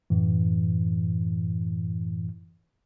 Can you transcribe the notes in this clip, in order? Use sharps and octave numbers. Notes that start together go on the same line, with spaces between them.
F#2 A2 E3